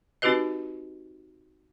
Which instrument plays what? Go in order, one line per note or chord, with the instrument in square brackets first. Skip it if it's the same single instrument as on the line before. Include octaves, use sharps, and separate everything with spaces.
[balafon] C4 D#4 F#4 G4 B4 D#5